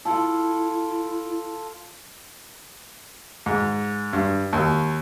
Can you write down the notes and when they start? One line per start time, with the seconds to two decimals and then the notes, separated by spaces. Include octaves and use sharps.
0.05 E4 F4 A4
3.46 G#2
4.13 G2
4.53 D#2